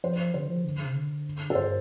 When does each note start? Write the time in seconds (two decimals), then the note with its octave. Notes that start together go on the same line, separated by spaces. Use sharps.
0.04 F3 C5
0.34 D3 C5
0.49 F3
0.65 D3
0.85 C3
0.95 D3
1.50 A4
1.55 G2 C5